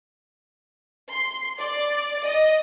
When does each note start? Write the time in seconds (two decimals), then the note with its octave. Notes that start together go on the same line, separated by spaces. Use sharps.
1.11 C6
1.61 D5
2.25 D#5